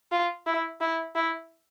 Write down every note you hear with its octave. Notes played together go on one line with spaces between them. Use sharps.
F4
E4
E4
E4